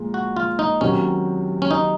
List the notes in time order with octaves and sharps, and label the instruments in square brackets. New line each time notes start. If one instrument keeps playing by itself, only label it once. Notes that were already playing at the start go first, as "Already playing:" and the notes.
Already playing: [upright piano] A#2 F3 G#3
[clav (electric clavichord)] F#4
F4
D#4
[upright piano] C3 D#3 F#3 [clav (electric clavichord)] C#4
[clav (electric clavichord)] C#4
D#4